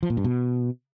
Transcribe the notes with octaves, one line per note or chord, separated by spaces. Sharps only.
F3
A#2
G2
B2